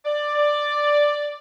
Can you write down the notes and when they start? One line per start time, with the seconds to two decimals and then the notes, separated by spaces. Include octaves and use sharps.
0.05 D5